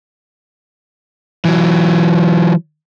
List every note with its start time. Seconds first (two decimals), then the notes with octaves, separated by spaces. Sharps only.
1.45 E3 F#3